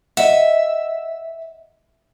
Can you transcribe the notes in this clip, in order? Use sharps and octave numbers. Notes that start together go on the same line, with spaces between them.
D#5 E5 F#5